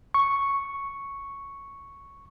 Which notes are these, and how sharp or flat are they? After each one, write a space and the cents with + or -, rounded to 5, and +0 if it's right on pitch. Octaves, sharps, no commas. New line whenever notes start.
C#6 +0